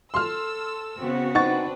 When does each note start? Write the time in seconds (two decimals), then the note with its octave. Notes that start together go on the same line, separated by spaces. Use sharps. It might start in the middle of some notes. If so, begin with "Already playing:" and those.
0.14 A4 C6 E6 F6
0.99 C#3 B3 C4 F#4
1.35 C4 D4 D#4 B4 F#5 C#6 A6